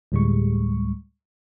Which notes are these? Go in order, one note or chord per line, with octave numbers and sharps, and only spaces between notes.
D2 A2 G3 G#3 C#6